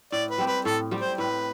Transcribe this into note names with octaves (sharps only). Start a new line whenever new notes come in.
A2 D5
B4
G3 C4 G4
B4
A2 A4
G3 C4 G4
C5
A2 B4